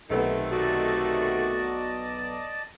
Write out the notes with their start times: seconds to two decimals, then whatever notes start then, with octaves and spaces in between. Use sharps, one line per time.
0.10 B1 C3 D#3 A3 B3 B4
0.51 F#4 D5 D#5 A5